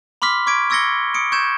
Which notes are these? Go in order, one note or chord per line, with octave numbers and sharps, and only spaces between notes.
B5 C6 D6 F6 B6
C#6 D6 G#6 B6 D7
C#6 E6 G#6 A#6 C#7 G7
D#6 C#7 D7
C#6 G6 G#6 E7